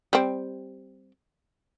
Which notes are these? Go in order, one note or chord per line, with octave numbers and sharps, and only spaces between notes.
G3 C4